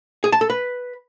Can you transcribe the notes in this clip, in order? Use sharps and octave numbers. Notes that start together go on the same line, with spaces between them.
G#4
A5
A4
B4